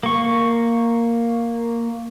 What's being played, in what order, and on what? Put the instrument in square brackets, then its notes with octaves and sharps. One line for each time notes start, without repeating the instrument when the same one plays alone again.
[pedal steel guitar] A#3 C#6